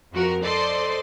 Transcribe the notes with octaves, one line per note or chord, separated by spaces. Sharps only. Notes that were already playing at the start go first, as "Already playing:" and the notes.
F2 F3 F#4 A#4 A#5
A4 C5 D5 D#5 C6